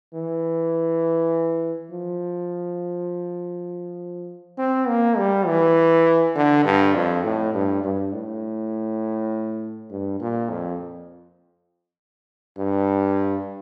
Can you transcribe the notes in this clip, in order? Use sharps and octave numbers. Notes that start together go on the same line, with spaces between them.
E3
F3
C4
A#3
G3
E3
D3
G2
F2
A2
G2
G2
A2
G2
A#2
F2
G2